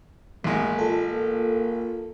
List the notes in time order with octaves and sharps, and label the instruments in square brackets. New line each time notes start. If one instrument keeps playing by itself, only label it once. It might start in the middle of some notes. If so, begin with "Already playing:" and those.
[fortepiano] A1 G#3 [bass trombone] A#3
[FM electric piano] F4 A4
[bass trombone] A#3